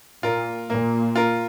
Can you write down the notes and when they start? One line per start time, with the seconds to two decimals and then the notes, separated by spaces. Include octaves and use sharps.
0.23 A#2 F4 A#4
0.70 A#2 A#3
1.16 F4 A#4